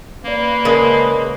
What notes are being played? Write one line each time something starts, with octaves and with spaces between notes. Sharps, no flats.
A#3 C#4 B4 D5
C#3 G#3 A#4 D5 A5